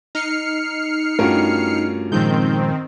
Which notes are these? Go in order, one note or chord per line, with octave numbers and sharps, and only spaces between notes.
D#4 F6 C7 C#7
G2 A3 C#4 F4 F#4 A#4
A#2 D#3 F3 G#3 C4 G6